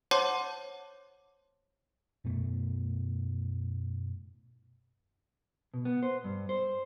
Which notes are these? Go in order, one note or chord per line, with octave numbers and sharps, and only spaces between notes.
C5 C#5 F#5 A5 C6 D6
F#2 B2 A3
B2
B3
C5
G2
C5